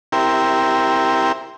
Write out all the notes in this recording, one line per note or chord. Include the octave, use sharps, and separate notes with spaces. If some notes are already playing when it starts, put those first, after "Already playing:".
C4 E4 G4 A#4